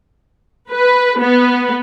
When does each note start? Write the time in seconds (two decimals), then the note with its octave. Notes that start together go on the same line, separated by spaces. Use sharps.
0.70 B4
1.20 B3